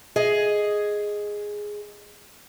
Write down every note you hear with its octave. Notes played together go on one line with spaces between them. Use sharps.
G#4 D#5